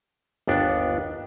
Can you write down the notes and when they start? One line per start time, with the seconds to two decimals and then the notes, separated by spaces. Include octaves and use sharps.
0.47 G1 D#2 B3 D4